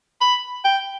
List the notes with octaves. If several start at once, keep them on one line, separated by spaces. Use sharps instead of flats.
B5
G5